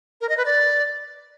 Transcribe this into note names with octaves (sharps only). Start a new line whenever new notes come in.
A#4
D#5
B4
D5